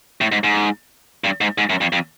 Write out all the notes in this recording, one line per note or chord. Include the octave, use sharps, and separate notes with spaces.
A2
G#2
G#2
G2
G#2
G#2
F#2
F2
F2